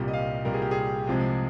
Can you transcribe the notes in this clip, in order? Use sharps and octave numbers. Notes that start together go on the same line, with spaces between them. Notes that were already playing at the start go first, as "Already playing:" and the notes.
Already playing: C2 A#2 G3
D#5
F5
C2 A#2 G3 A#4
G#4
G4
G#4
C2 C3 F3 G#3